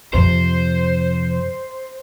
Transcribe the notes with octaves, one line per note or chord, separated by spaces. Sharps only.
F2 C3 C5